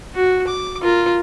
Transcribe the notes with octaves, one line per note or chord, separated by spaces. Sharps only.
F#4
D6
F4 A#4